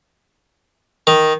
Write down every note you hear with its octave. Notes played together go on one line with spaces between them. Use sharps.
D#3